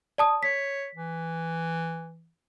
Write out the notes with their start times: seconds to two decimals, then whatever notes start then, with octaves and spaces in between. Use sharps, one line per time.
0.18 D5 A5 D#6
0.43 C#5 B6
0.95 E3